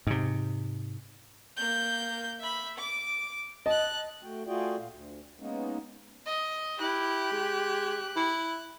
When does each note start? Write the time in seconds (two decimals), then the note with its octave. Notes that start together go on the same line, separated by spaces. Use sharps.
0.07 G#2 C3
1.57 A#3 G6
2.39 E5 B5
2.78 D6
3.66 D#5 A5 F#6
4.23 A3 F#4 G5
4.47 A3 F4 F#4 G#4 D5 G5
4.77 A#2 F4
4.91 D2
5.40 G#3 A#3 B3 C#4 D#4
6.26 D#5
6.80 E4 G4 F#6
7.32 G#3
8.17 E4